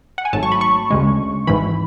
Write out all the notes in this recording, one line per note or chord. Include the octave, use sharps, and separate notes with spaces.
F#5
G#5
G#1 G#2 F#3 A3 A5
C#6
B5
C#6
D2 C#3 G#3
G#1 G#2 E3 B5